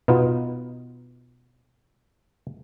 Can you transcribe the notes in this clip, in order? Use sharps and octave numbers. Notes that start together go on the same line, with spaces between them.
B2 B3 D#4 F4